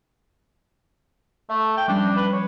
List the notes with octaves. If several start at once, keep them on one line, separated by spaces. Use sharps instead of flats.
A3 E5
G5
F3 G3 C#4 D4
B4
C#5